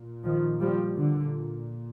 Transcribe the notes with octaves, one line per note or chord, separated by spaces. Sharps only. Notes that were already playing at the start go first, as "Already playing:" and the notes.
Already playing: A#2
D#3 F3
F3 G3
D3